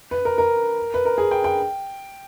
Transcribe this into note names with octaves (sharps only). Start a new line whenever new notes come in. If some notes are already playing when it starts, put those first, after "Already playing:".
B4
A#4
A#4
B4
A#4
G#4
G5
G5